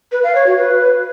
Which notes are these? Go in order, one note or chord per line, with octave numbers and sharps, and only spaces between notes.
B4
F5
C#5
F#4
B4